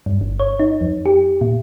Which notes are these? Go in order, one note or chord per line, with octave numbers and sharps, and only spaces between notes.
G2
G1
C#5
D#4
F2
G4
A#2